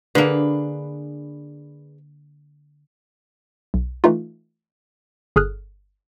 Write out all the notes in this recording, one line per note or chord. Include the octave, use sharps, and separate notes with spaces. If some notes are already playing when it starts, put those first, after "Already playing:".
D3 A#3 D4 G#4 B4
B1
E3 A3 D#4 F4
G1 G#4 A4 D#6 F6 F#6